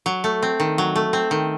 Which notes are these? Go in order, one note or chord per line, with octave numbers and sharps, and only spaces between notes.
F#3
A3
C4
D#3
F#3
A3
C4
D#3